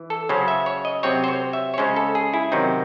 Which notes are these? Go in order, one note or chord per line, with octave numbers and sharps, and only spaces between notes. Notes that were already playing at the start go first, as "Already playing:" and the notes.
Already playing: E3
A4
C#3 F#3 C#4 C5
E5
C#5
D#5
C3 F#3 C4 C#5
C5
C#5
E5
C#5
C#3 G#3 C#4 C5
A4
G#4
E4
C3 D#3 F#3 C4 D#4